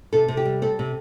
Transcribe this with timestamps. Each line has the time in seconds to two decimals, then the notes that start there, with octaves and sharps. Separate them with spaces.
0.13 C3 A4
0.28 C3
0.37 G4
0.45 G3
0.62 C4 A4
0.79 C3